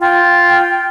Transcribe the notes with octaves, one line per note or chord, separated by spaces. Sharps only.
F4 G5